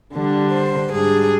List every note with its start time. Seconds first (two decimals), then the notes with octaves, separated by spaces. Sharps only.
0.13 D3 G3 D4
0.52 C5
0.91 G#2 G3 D4 G#4